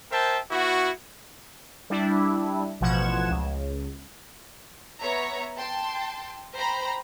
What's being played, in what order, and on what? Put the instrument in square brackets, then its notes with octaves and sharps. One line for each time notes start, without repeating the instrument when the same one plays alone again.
[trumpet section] A#4 C5 E5 G5 A5
B3 E4 F#4
[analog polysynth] G3 D4 E4
A1 B2 F3 F#5 G#6 E7
C#2
[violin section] B3 C#5 E5 A#5
G5 A5 C6
C5 G5 A#5 B5